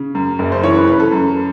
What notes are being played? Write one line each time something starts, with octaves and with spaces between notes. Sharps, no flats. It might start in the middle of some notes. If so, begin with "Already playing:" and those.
Already playing: C#3
F#2
F#1
C5
E3 C#5
B4
C#3 B4
A4
F#2